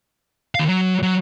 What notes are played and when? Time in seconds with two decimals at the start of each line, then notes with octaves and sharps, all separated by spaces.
0.55 D#3 F5
0.68 F#3
1.03 F#3